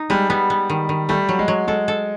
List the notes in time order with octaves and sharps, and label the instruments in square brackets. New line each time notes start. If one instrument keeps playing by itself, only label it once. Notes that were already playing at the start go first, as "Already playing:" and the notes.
Already playing: [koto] D#4
[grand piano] G3 [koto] G#3
[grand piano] G3 [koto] B3
[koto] B3
D#3
D#3
[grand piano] G3 [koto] A3
[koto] F#3
[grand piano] G#3
[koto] F#3
[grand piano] G#3 [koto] A4
[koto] A4